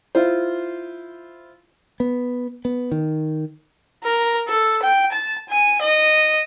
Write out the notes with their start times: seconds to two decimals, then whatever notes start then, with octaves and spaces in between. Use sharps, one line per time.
0.15 E4 F4 C5
2.00 B3
2.65 B3
2.92 D#3
4.04 A#4
4.48 A4
4.82 G5
5.12 A5
5.49 G#5
5.81 D#5